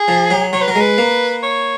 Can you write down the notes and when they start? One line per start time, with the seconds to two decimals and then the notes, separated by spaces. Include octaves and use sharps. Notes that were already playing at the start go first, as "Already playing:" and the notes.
Already playing: G#4
0.08 F3
0.31 F#3
0.53 F#3 C#5
0.62 B4
0.68 F#3
0.71 A#4
0.76 G#3
0.81 B4
0.98 A#3
1.43 C#5